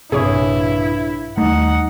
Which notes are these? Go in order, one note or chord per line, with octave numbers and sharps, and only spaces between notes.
A#1 G2 C3 E4 G#4 C#5
D#2 G3 A3 D#4 F#5